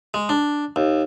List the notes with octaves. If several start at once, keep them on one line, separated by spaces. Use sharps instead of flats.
G#3
D4
D#2